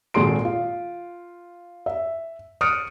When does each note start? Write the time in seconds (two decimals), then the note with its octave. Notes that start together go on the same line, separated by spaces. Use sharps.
0.14 G#1 A#2 G#3 A4 C6 D7
0.45 F4
1.86 E5
2.61 D#6 F6 F#6 C#7 D7